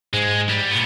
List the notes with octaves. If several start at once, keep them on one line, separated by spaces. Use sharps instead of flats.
G#2 G#3
G3
A#2 B3